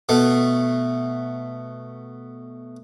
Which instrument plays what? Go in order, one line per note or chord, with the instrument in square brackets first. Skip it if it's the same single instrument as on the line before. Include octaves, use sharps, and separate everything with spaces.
[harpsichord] B2 A3